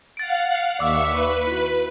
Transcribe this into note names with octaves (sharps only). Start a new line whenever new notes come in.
F5 F#5 A6 D7
D#2 D5 E5 C#6 D6 E6
B4
E4 F#4